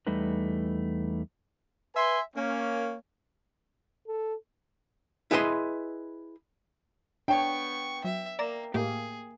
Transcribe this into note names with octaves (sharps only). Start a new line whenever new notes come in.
E2 G3 A3 D#4 B4
B4 E5 G#5 C6
A#3 C#4
A4
E4 G#4 B4 D#5 F#5 C6
B3 D4 C#5 G5 C#6
F#3 E5
A#3 D5 A#5 E7
A2 A#3 G4 G#4